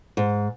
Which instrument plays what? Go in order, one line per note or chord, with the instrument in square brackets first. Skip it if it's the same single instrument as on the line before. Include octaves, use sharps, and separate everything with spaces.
[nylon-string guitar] G#2